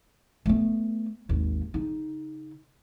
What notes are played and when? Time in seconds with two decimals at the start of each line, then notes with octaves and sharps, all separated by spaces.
0.46 A3 B3
1.29 G#1 D#2
1.74 C#3 D#4